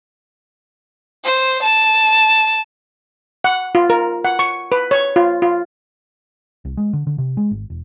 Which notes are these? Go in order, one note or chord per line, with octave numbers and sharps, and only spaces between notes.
C5
A5
F#5
F4
A#4
F#5
C#6
B4
C#5
F4
F4
C2
G#3
D3
D3
C3
G#3
G#1
E1